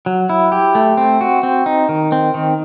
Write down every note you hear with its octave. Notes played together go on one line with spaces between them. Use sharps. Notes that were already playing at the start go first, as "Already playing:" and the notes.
F#3
E4
G4
A3
C4
F#4
C4
D#4
D#3
C4
D#3